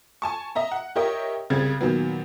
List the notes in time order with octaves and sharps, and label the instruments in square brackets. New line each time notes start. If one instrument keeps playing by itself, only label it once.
[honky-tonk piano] G#5 A5 C#6
D#5 E5 A#5
F#5
G4 A#4 C#5 D#5 E5 G5
C2 C#3 C4 G#6 A6
A#2 D#3 F#3 B3